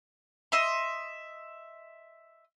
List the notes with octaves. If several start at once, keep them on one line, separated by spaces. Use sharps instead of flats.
D#5 E5 C6